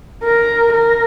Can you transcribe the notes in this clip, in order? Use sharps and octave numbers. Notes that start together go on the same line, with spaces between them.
A#4
A#4